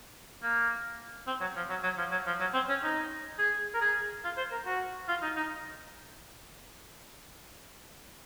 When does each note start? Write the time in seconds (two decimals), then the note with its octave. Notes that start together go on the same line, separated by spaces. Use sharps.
0.43 A#3
1.27 C4
1.40 F#3
1.56 F3
1.69 F#3
1.83 F#3
1.97 F3
2.11 F#3
2.26 F3
2.40 F#3
2.53 C4
2.69 C#4
2.83 D#4
3.38 G#4
3.74 A#4
3.81 G#4
4.24 F4
4.37 C5
4.52 A#4
4.66 F#4
5.08 F4
5.22 D#4
5.36 D#4